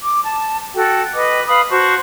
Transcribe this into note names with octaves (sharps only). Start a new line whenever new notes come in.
D6
A5
F#4 A4 G5
B4 D#5 D6
B4 F5 B5 D#6
F#4 C5 A5 C#6